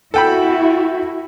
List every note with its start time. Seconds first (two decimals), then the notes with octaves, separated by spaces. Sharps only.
0.14 E4 F#4 A4 G5 B5